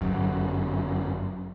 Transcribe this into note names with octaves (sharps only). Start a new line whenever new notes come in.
G1 F#2